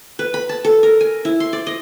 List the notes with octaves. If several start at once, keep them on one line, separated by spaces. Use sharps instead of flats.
B4
B5
A5
A4
A#4
G#5
E4
C6
D5
D#5